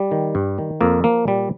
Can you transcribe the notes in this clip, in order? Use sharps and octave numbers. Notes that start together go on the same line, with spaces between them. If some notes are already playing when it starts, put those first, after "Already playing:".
Already playing: G3
D#3
G2
D#3
F2 A#3
F3 A#3
A#2 G3